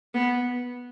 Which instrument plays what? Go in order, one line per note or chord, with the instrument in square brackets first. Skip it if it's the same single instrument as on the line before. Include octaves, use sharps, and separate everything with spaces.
[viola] B3